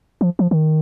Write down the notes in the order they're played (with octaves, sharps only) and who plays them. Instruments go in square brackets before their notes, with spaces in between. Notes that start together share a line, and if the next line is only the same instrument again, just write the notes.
[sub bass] F3
F3
D#3